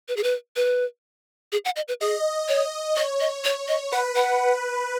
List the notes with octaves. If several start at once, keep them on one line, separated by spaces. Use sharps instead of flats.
B4
G#4
B4
B4
G#4
F#5
D#5
B4
G#4 D#5
C#5
C#5 D#5
D#5
C#5
D#5
B4 F#5
F#5